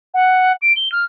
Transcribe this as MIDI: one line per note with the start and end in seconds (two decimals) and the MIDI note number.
0.14 0.52 78
0.62 0.73 98
0.76 0.91 103
0.92 1.05 89